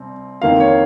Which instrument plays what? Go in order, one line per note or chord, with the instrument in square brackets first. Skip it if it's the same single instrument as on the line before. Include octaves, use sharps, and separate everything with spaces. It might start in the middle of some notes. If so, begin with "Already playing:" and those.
Already playing: [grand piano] C2 C4
F2 D#3 A#3 F5
C#5